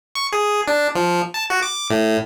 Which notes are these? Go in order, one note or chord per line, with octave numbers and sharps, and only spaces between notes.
C#6
G#4
D4
F3
A5
F#4
D6
A2